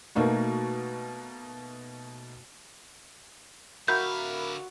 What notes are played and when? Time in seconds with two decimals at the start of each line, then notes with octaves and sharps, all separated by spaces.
0.15 B2 A3 A#3 D#4 F#4
3.88 D3 F#4 A#4 E5 F5 B5 C6 G6